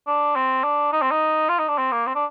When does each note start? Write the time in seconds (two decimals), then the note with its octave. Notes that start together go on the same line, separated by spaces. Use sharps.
0.07 D4
0.36 C4
0.64 D4
0.92 D#4
1.02 C4
1.11 D#4
1.49 F4
1.58 D#4
1.68 D4
1.78 C4
1.92 A#3
2.06 C4
2.15 D4